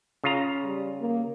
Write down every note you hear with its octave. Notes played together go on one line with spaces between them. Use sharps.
C#3 F4 A#5
G3
A#3